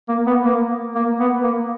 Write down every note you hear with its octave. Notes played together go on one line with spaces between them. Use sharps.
A#3
B3
A#3
A#3
B3
A#3